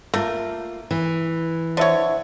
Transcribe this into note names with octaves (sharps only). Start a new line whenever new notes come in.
A3 A#3 F4 A#4
E3
D3 C5 C#5 E5